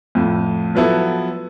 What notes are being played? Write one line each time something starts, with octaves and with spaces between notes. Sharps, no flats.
F2 A2
F3 F#3 B3 E4 A4